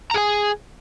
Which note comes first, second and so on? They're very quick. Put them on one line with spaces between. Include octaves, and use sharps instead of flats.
A#5 G#4 G#5